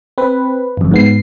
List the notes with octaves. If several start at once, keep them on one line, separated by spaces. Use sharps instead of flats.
C4 B4
G1 F2
G#2 B3 C7